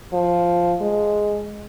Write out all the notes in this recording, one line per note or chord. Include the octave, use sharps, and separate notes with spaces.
F3
G#3